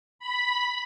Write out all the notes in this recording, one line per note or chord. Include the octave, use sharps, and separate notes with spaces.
B5